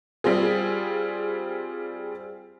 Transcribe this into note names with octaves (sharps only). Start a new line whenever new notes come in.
G3 C4 F4 G#4